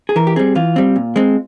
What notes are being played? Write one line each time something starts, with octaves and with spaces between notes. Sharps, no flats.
G#4
E3 A#4
G4
G3 C4 G#4
E3 F4
G3 C4
A#2
G#3 C4